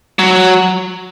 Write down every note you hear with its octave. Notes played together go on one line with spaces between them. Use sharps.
F#3